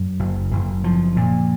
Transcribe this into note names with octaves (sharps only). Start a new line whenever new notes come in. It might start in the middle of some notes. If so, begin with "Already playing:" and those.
Already playing: F#2
F#1
F#1
F3
A#2